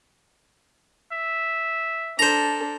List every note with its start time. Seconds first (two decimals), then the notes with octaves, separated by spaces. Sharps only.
1.12 E5
2.19 D4 A4 C5 A#5